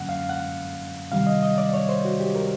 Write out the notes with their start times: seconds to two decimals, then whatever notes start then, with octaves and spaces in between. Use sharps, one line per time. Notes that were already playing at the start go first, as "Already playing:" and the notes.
Already playing: F#2 D3 F#3 A#3 C#4 F#5
0.09 F5
0.29 F#5
1.12 C3 D#3 G3 F5
1.27 D#5
1.43 D#5
1.58 D5
1.74 C#5
1.89 C5
2.05 F#4
2.20 G4
2.35 A#4